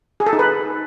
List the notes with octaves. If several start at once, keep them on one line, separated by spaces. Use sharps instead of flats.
G#4
A4
D#4
B4